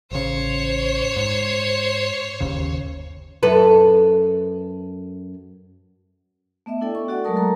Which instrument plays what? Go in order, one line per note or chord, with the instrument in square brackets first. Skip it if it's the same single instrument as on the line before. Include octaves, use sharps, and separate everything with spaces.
[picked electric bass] A1 C#3 [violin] C5 C#5
[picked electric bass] G#2
G1 D#2 C#3
[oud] F#2 A4 B4
[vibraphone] A3 B3 D#5 E5
D4 E4 A4 D5 G5
C#6
F#4 A4 D5 F#5
F#3 G#3 A3 A#4 A5 D#6
F#4 A4 A#4 A#5